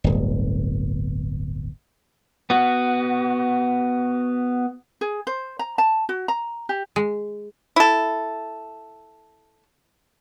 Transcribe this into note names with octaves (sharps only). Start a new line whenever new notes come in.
D1 G1
B3 F#4
G#4
C5
A#5
A5
F#4
A#5
G4
G#3
E4 A4